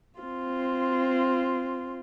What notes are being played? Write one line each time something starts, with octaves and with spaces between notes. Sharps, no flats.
C4 F4